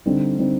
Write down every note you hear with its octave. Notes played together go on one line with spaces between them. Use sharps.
D3 G3 C4 D#4
D3 G3 C4 D#4